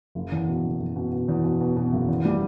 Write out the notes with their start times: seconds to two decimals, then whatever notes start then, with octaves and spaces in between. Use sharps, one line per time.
0.15 F#1
0.32 E2
0.48 B2
0.64 F#1
0.80 F#1
0.96 B2
1.12 B2
1.28 E2
1.44 B2
1.61 B2
1.76 B2
1.93 F#1
2.08 E2
2.25 G3